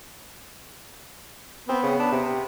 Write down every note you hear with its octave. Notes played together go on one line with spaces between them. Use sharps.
B3 C4
C#3
D4
C3